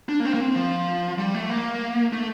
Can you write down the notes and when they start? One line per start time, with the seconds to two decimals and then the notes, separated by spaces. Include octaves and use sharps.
0.09 D4
0.20 A#3
0.25 C4
0.34 A#3
0.40 C4
0.55 F3
1.18 G3
1.34 A3
1.50 A#3
2.13 A3